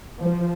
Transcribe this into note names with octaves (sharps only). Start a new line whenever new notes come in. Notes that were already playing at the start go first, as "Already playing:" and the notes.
F3